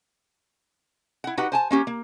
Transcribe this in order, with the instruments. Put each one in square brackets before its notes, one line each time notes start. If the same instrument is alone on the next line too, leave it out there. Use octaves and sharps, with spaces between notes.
[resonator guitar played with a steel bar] E4 F#5
D#4 F#4 G4 B4 F#5
C5 G#5 A5
A#3 C#4 G4
A#3